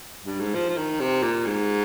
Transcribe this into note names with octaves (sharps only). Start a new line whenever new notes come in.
G2
G#2
F3
F3
D#3
C3
A#2
G#2